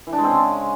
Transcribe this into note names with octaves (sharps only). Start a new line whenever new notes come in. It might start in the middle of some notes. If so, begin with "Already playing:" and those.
E3
D4
G#3
C4
C#3